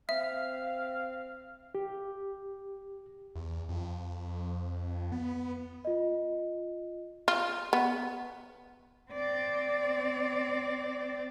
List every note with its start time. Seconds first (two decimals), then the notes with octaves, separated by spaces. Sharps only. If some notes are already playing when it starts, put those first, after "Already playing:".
0.09 C4 E5 F5
1.75 G4
3.35 E2
3.69 F2
5.12 B3
5.85 F4 D#5
7.28 F4
7.73 B3
9.12 C4 D5